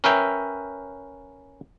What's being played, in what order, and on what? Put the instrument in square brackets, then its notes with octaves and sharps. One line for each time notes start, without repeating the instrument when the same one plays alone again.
[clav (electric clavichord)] C#4 A#4 B4 E5 G5